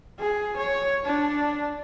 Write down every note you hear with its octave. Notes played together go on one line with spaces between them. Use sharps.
G#4
C#5
D4